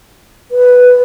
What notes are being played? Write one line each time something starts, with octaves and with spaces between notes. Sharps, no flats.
B4